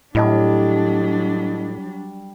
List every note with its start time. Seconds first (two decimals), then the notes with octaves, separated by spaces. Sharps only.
0.15 A2 F#3 G3 D4 E4 D#5 A5